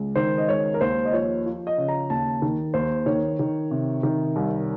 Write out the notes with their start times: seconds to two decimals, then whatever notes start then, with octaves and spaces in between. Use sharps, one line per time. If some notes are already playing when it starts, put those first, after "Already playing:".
Already playing: C#2
0.16 D#3 C5
0.38 D#5
0.48 C#2 C#5
0.74 A#4
0.81 D#2 C5
1.05 D#5
1.12 F3 C#5
1.46 F3
1.67 D#5
1.78 C#3
1.88 A#5
2.10 D#2 A5
2.42 D#3
2.74 D#2 C5
3.06 D#3 C#5
3.39 D#3
3.71 C3
4.03 D#3
4.36 C2